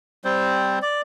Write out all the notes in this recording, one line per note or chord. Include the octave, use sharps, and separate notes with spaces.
G3 C4 C5
D5